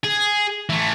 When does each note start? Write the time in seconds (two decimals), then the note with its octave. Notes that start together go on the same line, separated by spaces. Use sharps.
0.04 G#4
0.69 E3 A3